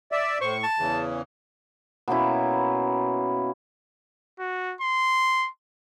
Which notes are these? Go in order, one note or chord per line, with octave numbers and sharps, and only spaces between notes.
D5 E5
A2 C5 C#6
A5
E2 C#3 E3
B2 A#3 C#4 E4
F#4
C6